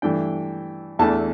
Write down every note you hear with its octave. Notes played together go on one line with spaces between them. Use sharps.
G2 E3 A3 D4 G5
E2 E3 A3 D4 A5